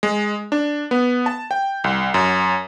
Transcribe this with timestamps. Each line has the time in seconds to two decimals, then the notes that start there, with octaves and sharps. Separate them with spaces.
0.03 G#3
0.52 D4
0.91 B3
1.26 A5
1.51 G5
1.84 C2
2.14 F#2